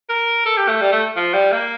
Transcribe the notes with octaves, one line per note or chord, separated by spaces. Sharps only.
A#4
A4
G4
A3
G3
A3
F3
G3
A#3